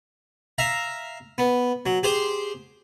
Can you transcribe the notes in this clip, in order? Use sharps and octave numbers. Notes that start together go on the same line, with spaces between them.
E5 F5 A#5
B3
F#3
G4 G#4 C5 C6